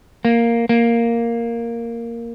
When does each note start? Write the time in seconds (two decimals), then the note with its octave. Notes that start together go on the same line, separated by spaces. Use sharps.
0.25 A#3
0.69 A#3